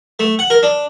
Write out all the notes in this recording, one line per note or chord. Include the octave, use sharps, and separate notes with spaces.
A3
F#5
A#4
D4